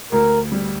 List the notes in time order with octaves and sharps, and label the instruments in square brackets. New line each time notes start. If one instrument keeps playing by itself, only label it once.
[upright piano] D2 [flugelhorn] A#4
[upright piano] G3